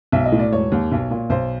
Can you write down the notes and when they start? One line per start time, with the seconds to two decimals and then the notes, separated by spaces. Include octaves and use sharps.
0.12 B1 E5
0.26 D#5
0.32 A2
0.39 D5
0.53 E1 C#5
0.72 D#2
0.92 B1
1.11 A#2
1.30 B1 C5